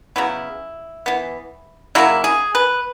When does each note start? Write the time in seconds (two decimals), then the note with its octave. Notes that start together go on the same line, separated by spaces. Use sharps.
0.16 C#3 F#3 B3 E4
1.06 E3 B3
1.95 C#3 F#3 A#3 E4
2.24 G#4
2.55 B4